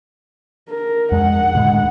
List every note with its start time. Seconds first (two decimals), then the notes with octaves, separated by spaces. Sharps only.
0.69 A#4
1.12 F2 G#3 F#5
1.55 D2 A2 G#3